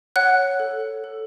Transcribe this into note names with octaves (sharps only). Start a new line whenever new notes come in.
C#5 F#5 F#6
A4
A4